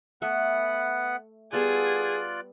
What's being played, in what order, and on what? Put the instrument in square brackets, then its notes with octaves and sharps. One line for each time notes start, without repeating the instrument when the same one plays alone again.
[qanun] A3 [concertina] B3 B4 F#5
[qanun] G3 B3 A4 [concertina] F4 D5 F#6 [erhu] G#4